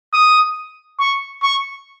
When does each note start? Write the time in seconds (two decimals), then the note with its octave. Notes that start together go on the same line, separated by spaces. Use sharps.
0.13 D#6
1.00 C#6
1.43 C#6